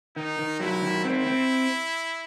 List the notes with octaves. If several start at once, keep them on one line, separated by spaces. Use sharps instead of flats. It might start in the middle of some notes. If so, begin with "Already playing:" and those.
D#3 D#4
D#3
F#3 E4
D#3
C4 E4
C4